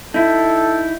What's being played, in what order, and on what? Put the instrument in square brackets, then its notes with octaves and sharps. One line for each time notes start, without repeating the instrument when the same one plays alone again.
[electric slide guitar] D#4 E4 [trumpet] A4